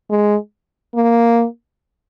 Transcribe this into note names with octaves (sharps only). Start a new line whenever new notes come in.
G#3
A#3